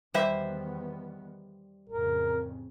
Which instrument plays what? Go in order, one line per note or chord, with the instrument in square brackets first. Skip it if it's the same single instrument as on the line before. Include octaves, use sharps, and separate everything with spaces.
[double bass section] E2 D#3 B3 [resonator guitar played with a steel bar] G3 C5 E5
[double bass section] A1 F2 C#3 [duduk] A#4